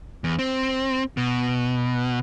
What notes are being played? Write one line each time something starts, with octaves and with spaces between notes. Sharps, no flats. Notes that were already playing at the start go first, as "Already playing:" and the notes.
E2
C4
B2